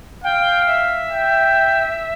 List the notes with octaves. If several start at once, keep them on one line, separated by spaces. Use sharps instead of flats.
F5 G5
E5
G5